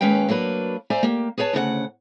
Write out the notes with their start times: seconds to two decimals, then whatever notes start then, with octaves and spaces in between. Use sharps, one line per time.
0.01 D#2 G#3 C#4 B4 F5 G5
0.28 F#3 A#3 D4 B4
0.90 C5 D5 E5 G#5 A#5
1.03 A#3 G4
1.38 G#4 B4 C#5 G5 A5
1.53 D2 C#3 B4 F#5